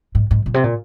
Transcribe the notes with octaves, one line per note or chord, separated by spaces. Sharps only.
G#2
G#2
A#2
C3
A#2